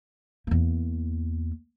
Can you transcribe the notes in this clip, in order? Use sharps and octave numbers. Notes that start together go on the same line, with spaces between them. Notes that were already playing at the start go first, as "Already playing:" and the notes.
E2 A#3